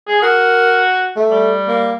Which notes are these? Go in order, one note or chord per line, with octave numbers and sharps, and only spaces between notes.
G#4
F#4 A#4
A3
G3
A#3